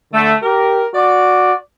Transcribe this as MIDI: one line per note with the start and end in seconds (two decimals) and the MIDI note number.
0.14 0.35 50
0.14 0.35 57
0.43 0.86 67
0.43 0.86 70
0.95 1.54 66
0.95 1.54 74